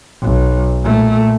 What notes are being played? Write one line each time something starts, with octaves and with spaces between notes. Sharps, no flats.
B1
A#2 A3